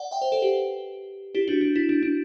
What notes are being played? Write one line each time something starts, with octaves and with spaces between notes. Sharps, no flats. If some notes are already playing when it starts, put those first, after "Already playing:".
Already playing: D5 F#5
E5 G5
C5 E5
A4 C5
G4 B4
E4 G4
D4 F#4
D4
E4
D4
D4